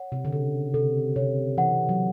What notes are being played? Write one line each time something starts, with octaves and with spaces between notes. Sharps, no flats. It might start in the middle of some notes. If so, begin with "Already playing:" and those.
Already playing: C#5 F#5
C3
D3
C#3 A4
C3 A4
C3 C#5
E3 F#5
F#3